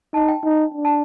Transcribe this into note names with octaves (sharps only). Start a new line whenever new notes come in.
D#4 A5
G5
D#4
D4
A5